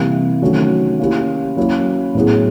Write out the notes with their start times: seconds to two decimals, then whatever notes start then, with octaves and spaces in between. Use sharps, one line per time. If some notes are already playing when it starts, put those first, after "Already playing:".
Already playing: C3 E3 G3 A#3
0.42 D#3 F#3 A3 C#4 F#4
0.99 A#3 C#4 E4 G4
1.57 F#3 A#3 C#4 E4
2.15 A2 F#3 B3 E4 G#4